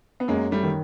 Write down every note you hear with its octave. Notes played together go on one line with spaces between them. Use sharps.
B3
F#2 G#3 A#3
G3 A3
D#3